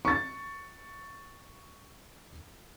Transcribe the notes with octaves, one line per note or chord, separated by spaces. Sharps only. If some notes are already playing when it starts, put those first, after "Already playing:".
C#6 A6